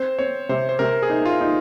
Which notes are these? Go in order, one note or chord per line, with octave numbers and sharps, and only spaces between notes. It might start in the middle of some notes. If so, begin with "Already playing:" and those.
Already playing: C4 C5
C4 C#5
C3 C5
C5
C3 A#4
G#4
D#4
F4
D#4